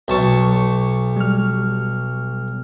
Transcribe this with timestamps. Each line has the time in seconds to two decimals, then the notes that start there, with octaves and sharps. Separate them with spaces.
0.08 B1 A5 C#6
1.16 G3 F6